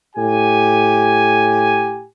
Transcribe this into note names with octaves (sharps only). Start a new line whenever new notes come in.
A2 G4 G#5